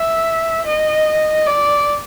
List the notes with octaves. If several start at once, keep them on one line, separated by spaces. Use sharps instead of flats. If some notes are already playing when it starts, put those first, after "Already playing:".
Already playing: E5
D#5
D5